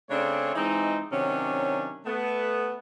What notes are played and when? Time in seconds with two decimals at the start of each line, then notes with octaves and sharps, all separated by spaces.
0.10 C#3 A3 C4 D4 C#5
0.55 E3 G#3 C4 D#4
1.11 C3 D#3 F#3 C#4 D4
2.06 A3 B3